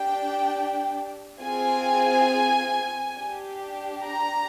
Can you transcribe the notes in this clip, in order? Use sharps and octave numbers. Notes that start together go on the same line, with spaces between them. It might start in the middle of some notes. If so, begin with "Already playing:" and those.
Already playing: D4 G4 G5
C4 F4 G#4 G#5
D4 G4
A#5